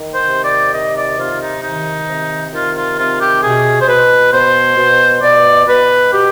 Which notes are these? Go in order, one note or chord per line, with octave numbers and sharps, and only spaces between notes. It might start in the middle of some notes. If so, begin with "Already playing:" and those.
Already playing: D#3
C5
C3
D5
D#3 D#5
D5
C3 F4
D#4
D#3 D#4
C3
D#3 F4
F4
C3 F4
G4
B2 G#4
C5
B2 B4
B2 C5
B2
B2 D5
B2 B4
B2 G4